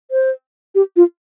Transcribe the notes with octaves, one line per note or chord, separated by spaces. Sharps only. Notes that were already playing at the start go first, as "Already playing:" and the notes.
C5
G4
F4